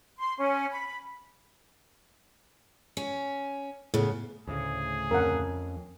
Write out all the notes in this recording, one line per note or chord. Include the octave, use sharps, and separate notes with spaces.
C6
C#4
B5
C#4
A2 C#3 B3
D2 A2 C#3 G#4
F2 C#4 A#4 F#5